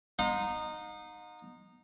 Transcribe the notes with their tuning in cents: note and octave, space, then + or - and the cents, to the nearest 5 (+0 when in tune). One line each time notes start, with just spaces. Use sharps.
D#4 -15 F#5 -45 C6 -20